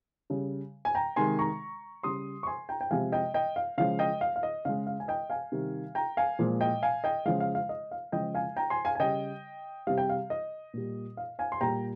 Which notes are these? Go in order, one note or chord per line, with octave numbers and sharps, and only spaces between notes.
C#3 G3
G#5
G5 A#5
C3 D#3 G#3 G#5 C6
A#5 C#6
C#3 G3 C6 D#6
C#6
G#5 C6
G5 A#5
G5
C3 F3 G#3 F5 G#5
D#5 G5
D#5 G5
F5
C#3 F3 G#3 F5
D#5 G5
F5
F5
D#5
C#3 G#3 F5
F5
G#5
D#5 G5
F5 G#5
C3 D#3 G3
G5 A#5
F5 G#5
A#2 F3 G#3
D#5 G5
F5 G#5
D#5 G5
C#3 F3 G#3 F5
F5
F5
D#5
F5
C#3 F3 G#3 D#5 G5
F5 G#5
G5 A#5
G#5 C6
F5 G#5
G#5
C#3 G3 D#5 G5
C3 G3 F5
G5
F5
D#5
A#2 G3
F5
F5 G#5
C6
A#2 G3 G5 A#5